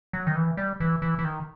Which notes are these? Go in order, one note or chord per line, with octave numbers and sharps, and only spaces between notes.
F#3
D#3
E3
G3
E3
E3
E3
D#3